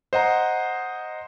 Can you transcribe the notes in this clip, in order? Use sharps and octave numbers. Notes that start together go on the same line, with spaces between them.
C5 D#5 F#5 A#5